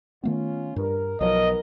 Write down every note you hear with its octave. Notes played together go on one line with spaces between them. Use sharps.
D#3 A3 B3 C#4 F4
G2 A#4
B1 F3 F#3 B3 D#4 A#4 D#5